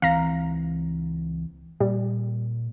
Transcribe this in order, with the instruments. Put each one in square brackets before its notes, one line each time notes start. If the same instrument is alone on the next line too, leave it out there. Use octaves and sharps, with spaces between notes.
[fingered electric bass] C#2 E3 C4 [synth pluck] F5 A#5
[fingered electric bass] A#2 [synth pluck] G3